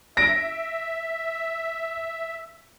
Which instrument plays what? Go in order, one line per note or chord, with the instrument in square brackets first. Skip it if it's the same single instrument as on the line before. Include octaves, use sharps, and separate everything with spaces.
[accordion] E5 [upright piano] A#6 D7